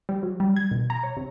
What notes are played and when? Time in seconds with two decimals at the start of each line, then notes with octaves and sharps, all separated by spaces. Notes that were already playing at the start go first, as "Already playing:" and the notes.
0.09 G3
0.23 F#3
0.40 G3
0.56 G#6
0.71 B2
0.90 A#5
1.03 C#5
1.17 C3